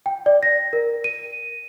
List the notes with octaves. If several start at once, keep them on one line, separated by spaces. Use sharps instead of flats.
G5
D5
A#6
A#4
D#7